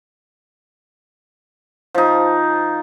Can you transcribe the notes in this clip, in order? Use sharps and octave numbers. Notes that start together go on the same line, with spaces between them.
F3 D#4